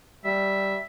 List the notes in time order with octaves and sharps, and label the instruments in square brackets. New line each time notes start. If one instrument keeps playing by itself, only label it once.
[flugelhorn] G3 [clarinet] E5